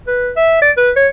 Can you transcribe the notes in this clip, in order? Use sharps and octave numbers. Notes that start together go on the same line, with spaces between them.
B4
E5
D5
B4
C#5